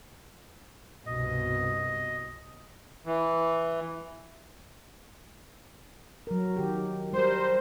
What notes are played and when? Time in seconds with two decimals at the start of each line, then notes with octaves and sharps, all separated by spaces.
1.06 C2 G2 B2 D#5
3.06 E3
6.27 F#3 A#4
6.56 D#3 G4
7.13 G3 A#4 C5